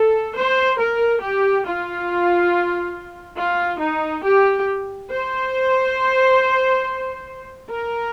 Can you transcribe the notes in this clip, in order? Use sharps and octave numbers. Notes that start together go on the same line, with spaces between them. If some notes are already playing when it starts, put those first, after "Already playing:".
Already playing: A4
C5
A#4
G4
F4
F4
D#4
G4
C5
A#4